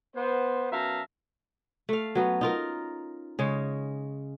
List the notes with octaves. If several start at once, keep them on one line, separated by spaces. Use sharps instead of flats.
B3 C5
F#2 B3 E5 F5 A5 A#5
A3 F5
F#3 B3 C#4
D#4 F4 A#4
C#3 G#3 C#5